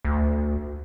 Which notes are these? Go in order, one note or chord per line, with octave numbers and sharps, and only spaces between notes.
D2